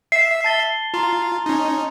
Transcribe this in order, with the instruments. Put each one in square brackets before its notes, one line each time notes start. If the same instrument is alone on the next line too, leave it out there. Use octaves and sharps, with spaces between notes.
[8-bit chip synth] E5 [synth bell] C7
[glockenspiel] A5 A6 G7
[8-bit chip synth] F4 [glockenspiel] A#5 C6
[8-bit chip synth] C#4 D#4